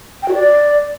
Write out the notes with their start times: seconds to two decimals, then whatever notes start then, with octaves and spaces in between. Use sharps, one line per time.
0.23 G5
0.28 F#4
0.34 D5